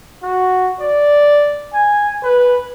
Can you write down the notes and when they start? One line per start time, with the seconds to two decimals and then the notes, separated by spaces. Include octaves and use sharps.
0.23 F#4
0.81 D5
1.74 G#5
2.24 B4